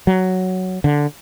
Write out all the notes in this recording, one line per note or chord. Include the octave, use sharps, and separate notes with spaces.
F#3
D3